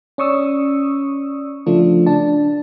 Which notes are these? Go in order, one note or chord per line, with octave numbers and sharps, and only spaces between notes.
C#4 D5 C#6 D#6 E6
C#3 F3 A3 D4 F4
D4 A5